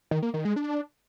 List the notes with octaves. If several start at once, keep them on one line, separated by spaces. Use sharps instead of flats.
D#3
A#3
D#3
G#3
D4